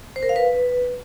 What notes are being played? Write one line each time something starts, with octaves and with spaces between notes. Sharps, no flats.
C5
A#4
F5
B4